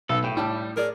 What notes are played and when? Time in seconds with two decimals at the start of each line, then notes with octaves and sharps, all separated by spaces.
0.09 B1 A4
0.24 A2 G5
0.37 A2 G3 G4 D5 A5
0.77 G#4 A#4 C#5 D5